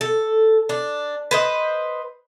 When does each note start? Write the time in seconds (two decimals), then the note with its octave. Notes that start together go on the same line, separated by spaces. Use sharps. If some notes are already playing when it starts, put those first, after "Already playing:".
0.01 A4
0.69 D4
1.31 B4 C5 D#5